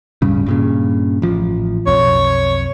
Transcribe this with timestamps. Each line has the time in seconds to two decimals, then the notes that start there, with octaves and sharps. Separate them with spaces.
0.22 D1 G2 C#3
0.46 G2 A#2 C#3
1.22 A1 F3
1.87 B1 F2 C#5